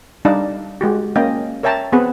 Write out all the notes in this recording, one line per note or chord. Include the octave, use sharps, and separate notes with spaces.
G3 D4 D#4 D5 F5 A5
G#3 F#4 G4
A#3 C#4 D#5 F5 G5
A#4 C#5 E5 G5 A5 A#5
B3 C4 G#4 B4 F#5